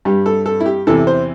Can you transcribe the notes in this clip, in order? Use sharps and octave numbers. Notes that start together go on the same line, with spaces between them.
G2 G3 G4
A4
A4
E4
G4
E2 C3 E3 A4
C5